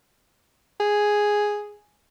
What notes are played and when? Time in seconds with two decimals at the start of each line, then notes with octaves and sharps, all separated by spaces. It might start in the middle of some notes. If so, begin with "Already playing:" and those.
0.80 G#4